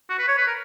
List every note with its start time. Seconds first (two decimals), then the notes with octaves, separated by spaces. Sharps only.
0.09 F#4
0.19 B4
0.28 C#5
0.38 B4
0.47 A#4